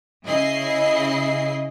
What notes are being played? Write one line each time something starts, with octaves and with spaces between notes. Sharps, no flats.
C#3 E4 G#4 D#5 C7